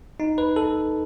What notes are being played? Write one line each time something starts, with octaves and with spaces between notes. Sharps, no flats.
D#4
B4
A4